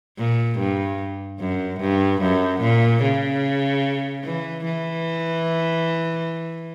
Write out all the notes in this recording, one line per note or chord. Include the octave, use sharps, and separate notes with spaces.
A#2
G2
F#2
G2
F#2
A#2
C#3
E3
E3